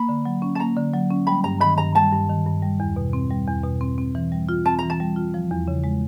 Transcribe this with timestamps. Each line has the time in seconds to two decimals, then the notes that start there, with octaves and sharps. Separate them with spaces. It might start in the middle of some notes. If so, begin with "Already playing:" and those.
Already playing: A#3 B5
0.09 D3
0.25 F#3
0.42 C#4
0.55 A5
0.60 A#3 A#5
0.77 D3
0.94 F#3
1.10 C#4
1.27 G3 B5
1.44 G2 A#5
1.61 D#3 B5
1.78 G2 A#5
1.95 G3 A5
2.12 G2
2.29 D#3
2.46 G2
2.63 G3
2.80 E2
2.96 B2
3.13 C4
3.30 G3
3.47 E2
3.64 B2
3.81 C4
3.98 C4
4.15 E3
4.32 G3
4.49 F4
4.66 C4 A5
4.79 E3 A#5
4.90 A5
5.00 G3
5.16 F4
5.34 F3
5.51 E2
5.68 C#3
5.84 G#3